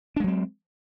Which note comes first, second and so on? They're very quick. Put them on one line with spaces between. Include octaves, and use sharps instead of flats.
D4 G#3 F#3 C4